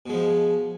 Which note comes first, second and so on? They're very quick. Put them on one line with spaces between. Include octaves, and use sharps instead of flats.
B2 G#3 F3